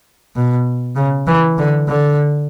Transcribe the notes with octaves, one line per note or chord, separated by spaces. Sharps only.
B2
C#3
E3
D3
D3